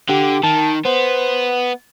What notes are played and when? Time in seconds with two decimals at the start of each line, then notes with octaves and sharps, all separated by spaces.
0.09 D3 G4
0.44 D#3 A5
0.85 B3 C5